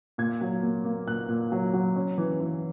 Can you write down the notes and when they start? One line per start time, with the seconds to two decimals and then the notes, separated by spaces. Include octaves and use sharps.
0.18 A#2 G#6
0.41 F#3
0.63 A#3
0.85 A#3
1.07 A#2 F#6
1.29 A#2
1.52 F#3
1.73 F#3
1.96 C#4
2.18 E3
2.40 E3